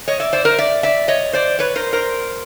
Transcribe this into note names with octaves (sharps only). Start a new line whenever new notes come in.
C#5 D#5
D5 E5
C5 D5
A#4 C5
D5 E5
D5 E5
C#5 D#5
C5 D5
B4 C#5
A#4 C5
A#4 C5